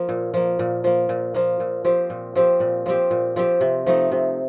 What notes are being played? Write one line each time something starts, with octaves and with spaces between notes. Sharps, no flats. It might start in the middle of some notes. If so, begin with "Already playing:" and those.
Already playing: F3 A#3
A#2
F3 A#3
A#2
F3 A#3
A#2
F3 A#3
A#2
F3 C4 G4
A#2
F3 C4 G4
A#2
F3 C4 G4
A#2
F3 C4 G4
C3
F3 A3 D#4
C3